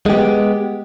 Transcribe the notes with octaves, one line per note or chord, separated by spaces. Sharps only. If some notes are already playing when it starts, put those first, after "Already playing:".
G#3 B3 G4